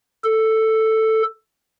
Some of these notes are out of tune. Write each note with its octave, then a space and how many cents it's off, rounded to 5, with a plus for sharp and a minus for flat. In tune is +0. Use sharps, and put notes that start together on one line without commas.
A4 +5